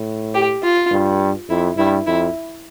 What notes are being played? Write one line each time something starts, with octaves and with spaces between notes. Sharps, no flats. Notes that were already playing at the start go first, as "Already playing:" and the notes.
Already playing: A2
G4
F4
G2
F2 E4
G2 E4
F2 E4